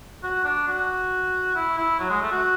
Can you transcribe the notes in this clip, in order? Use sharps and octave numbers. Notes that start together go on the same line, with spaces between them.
F#4
D4
F#4
E4
E4
F#3
G#3
A3
F#4